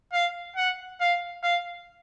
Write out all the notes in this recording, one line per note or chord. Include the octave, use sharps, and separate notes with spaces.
F5
F#5
F5
F5